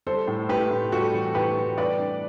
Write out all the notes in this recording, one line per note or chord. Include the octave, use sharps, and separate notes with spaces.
G3 A4 C5
A2
A2 G4 B4
A2
G3 F#4 A4
E3
A2 G4 B4
E3
G3 B4 D5
D4